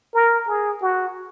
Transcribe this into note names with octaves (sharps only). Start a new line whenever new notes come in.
A#4
G#4
F#4